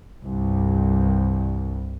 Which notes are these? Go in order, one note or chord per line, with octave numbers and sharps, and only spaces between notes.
C2 G2